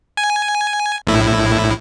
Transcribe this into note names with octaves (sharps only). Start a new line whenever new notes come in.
G#5
A#1 A2 E4